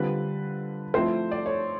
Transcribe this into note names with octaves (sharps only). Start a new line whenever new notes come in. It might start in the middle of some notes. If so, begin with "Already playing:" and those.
Already playing: D3 G3 C4 F4 B4
F3 A3 C4 E4 C5
D5
C#5